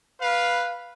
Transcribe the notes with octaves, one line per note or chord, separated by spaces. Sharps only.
B4 F5